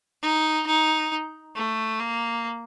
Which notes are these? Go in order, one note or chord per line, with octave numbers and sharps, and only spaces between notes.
D#4
D#4
A3
A#3